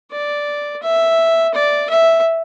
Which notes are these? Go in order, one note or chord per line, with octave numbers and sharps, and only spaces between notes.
D5
E5
D5
E5